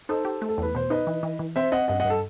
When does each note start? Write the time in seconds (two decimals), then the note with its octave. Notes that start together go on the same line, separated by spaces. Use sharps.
0.09 D#4 A4 C5
0.25 G4
0.42 A3
0.49 A4
0.58 E2 B4
0.75 B2 C5
0.90 D#4 B4 D#5
1.07 E3
1.23 E3
1.39 E3
1.56 C4 C5 E5
1.72 C4 D#5 F#5
1.88 G2 D#5 F#5
2.00 D#5 F#5
2.04 G2
2.10 A4